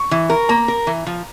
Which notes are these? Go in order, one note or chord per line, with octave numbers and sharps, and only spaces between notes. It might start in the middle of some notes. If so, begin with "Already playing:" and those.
Already playing: C#6
E3
A#4
A#3 A#5
A#4
E3
F3